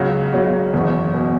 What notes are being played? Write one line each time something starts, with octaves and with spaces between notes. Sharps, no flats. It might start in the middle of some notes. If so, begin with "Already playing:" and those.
Already playing: C#2 C#3 F#3 C#4 F#4
C#2 C#3 F#3 C#4 F#4
F#1 E2 B2
B2